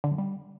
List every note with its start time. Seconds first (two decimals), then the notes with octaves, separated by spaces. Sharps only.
0.04 D3
0.11 F#2
0.18 G3